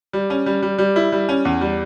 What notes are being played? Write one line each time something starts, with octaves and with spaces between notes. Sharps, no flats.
G3
C#4
G3
G3
G3
E4
G3
C#4
E2
G3